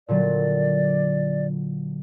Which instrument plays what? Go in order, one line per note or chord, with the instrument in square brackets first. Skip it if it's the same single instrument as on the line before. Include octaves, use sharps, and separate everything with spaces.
[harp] A#2 D3 F#3 [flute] D5